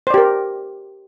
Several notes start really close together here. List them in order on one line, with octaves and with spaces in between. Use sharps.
C5 D5 G4 A#4